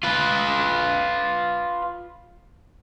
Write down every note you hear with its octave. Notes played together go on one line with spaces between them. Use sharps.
F4 B4